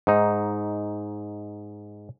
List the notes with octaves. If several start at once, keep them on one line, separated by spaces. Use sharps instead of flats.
G#2 D#4